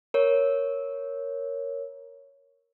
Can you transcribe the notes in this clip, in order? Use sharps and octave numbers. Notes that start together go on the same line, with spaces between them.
A#4 C#5